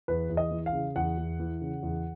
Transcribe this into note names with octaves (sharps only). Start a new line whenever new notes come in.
E2 B4
E2
D#5
E3
F5
C#3
E2 F#5
E2
E3
C#3
E2